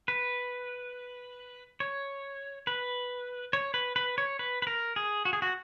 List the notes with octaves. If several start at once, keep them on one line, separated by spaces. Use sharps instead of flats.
B4
C#5
B4
C#5
B4
B4
C#5
B4
B4
A#4
G#4
F#4
G#4
F#4